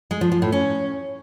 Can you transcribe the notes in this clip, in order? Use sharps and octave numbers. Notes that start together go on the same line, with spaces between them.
G#3
F3
F3
A2
C#4